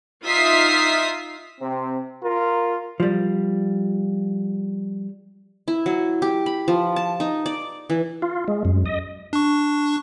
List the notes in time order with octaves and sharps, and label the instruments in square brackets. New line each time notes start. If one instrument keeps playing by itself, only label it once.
[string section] D#4 F4 E5 D#6 B6 C7
[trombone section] C3 C4
F4 A#4
[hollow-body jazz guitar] F3 G3
[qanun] E4
F#3
G4
B5
F3
A5
D#4
D5
E3
[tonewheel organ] F4
G#3
F#2
D#5
[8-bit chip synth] D4 C#6